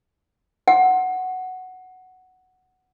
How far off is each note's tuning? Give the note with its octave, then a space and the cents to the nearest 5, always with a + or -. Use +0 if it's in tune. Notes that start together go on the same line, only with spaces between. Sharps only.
F#5 +5